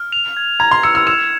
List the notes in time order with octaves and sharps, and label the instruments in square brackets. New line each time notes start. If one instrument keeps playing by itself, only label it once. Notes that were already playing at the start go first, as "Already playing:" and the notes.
Already playing: [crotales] F6
F7
G#6
[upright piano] A#5 [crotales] G#6
[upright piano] C6
[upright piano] E6 [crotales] C#7
[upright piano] E6
[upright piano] E6 [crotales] E7